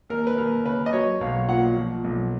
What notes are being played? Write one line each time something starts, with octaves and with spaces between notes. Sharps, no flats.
D#2 A#4
B4
D#2 A#4
C#3 B4
D#5
F#3 C#5
B1 F5
A#2 F#5
F3
B1